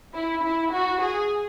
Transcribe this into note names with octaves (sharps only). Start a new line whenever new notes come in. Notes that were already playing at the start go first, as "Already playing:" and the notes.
E4
E4
F#4
G#4